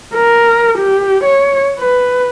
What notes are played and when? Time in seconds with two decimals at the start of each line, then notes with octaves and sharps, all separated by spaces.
0.15 A#4
0.79 G4
1.25 C#5
1.80 B4